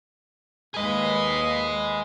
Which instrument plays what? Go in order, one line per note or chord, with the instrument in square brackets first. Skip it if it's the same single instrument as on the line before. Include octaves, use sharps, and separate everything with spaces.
[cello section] D#2 B4 F5 [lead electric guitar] G#4 D#5